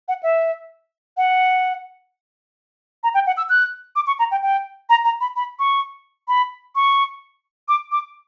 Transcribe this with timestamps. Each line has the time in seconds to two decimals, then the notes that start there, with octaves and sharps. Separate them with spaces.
0.08 F#5
0.23 E5
1.17 F#5
3.03 A#5
3.14 G5
3.27 F#5
3.37 E6
3.49 F#6
3.96 D6
4.07 C#6
4.19 A#5
4.31 G5
4.43 G5
4.90 A#5
5.04 A#5
5.21 B5
5.36 B5
5.59 C#6
6.28 B5
6.76 C#6
7.68 D6
7.92 D6